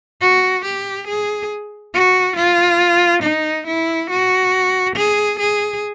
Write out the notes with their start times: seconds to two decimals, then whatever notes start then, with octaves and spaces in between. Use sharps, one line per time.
0.21 F#4
0.65 G4
1.08 G#4
1.94 F#4
2.37 F4
3.23 D#4
3.67 E4
4.10 F#4
4.96 G#4
5.39 G#4